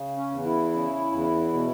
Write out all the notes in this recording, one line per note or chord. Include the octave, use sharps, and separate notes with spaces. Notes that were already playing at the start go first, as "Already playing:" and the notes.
Already playing: C#3
C#4
E2
E4
C#3
E2
B2